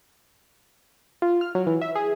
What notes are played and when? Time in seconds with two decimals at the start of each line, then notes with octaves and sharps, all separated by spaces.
1.22 F4
1.41 F6
1.55 F#3
1.66 E3
1.81 E5
1.95 G#4